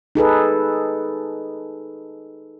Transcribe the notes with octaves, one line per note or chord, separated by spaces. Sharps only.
D#4 G#4 A4 B4